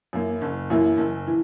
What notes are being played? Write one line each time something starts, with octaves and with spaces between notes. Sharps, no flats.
F#2 E3 A#3 E4
F#1
F#2 E3 A#3 E4
F#1
E3